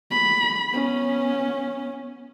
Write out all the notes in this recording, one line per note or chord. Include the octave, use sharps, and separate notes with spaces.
B5
B3 C#4